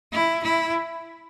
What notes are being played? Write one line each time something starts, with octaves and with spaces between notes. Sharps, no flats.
E4
E4